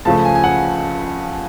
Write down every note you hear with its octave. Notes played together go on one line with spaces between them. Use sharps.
C#2 C#3 F3 A3 A5
G#5
G#5
F#5